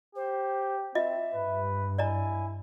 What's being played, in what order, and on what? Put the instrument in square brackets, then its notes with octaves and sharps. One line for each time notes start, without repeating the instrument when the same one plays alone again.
[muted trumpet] G4 [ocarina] C5
[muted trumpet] C4 [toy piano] F4 D#5 [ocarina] E5
[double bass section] G2 [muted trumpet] B4
[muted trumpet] E4 [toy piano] D5 D#5 A#5 [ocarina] G#5